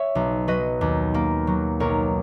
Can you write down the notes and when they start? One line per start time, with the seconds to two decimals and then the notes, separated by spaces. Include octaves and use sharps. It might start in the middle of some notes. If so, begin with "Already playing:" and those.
Already playing: C#5 E5 F#5
0.15 B1
0.48 F#3 B4 D#5
0.81 D#2
1.14 A#3
1.47 F#3
1.80 B1 A#4 C#5